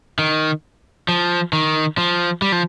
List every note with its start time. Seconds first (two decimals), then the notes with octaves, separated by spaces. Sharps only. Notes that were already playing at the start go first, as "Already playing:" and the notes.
0.19 D#3
1.08 F3
1.53 D#3
1.98 F3
2.42 G3
2.52 F3